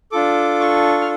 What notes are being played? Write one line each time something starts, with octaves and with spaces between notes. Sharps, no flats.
D4 F4 A4 D6
C#6
F6